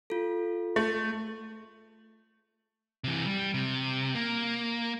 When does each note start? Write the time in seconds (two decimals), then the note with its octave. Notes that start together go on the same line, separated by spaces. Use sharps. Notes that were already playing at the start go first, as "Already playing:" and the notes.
0.10 F4 A4
0.76 A3
3.04 C3 E3
3.26 G3
3.54 C3
4.15 A#3